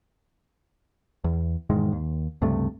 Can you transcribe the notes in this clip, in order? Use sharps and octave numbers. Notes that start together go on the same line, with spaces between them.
E2
E1 G#2 D#3 G#3
D#2
C#2 G2 C3 A3